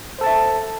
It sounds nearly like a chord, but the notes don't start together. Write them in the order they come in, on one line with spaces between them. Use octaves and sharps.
C5 A4 A5 E5